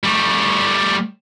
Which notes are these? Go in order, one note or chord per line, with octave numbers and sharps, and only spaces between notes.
G3 A3